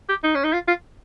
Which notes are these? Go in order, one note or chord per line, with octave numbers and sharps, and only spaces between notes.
G4
D#4
C#4
D#4
F4
F4